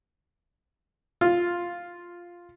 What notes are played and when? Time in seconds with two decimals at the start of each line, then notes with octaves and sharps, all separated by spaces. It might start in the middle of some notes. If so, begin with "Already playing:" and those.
1.21 F4